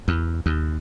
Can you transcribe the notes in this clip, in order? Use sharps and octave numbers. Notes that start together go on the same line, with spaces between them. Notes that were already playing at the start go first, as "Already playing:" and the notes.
E2
D#2